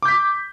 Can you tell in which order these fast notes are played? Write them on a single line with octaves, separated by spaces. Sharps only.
D6 G6 B6